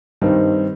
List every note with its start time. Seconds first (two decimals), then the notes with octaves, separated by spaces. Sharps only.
0.21 G2 D#3 G3 C4 D#4